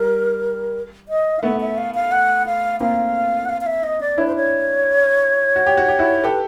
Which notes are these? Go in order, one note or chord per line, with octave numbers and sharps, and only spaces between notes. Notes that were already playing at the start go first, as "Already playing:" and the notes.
Already playing: G3 A#4
D#5
F5
A3 B3 E5
E5
F5
F5
F#5
F5
A#3 C4 F5
F#5
F5
F5
E5
D#5
D5
D4 E4 C#5
C5
C#5
F#4
G4
F#4
G4
E4 F#4
G4 A4 B4